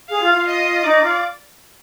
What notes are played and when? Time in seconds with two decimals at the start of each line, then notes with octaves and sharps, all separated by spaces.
0.09 G#4 F5
0.22 F4
0.34 F4
0.47 D#5
0.84 D#4 D5
1.02 F4